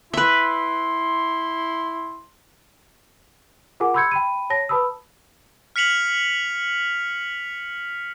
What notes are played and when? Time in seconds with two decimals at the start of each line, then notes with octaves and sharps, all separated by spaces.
0.13 E4 B4 E5 C6
3.80 F4 G#4 A#4 F#5 G#5 D6
3.94 B5 C6 E6 G6 G#6 C#7
4.11 G5 B5 D#7
4.50 C#5 A5 A#6
4.69 B4 A5 B5 D#6 E6
5.76 F6 B6 C#7 F7 F#7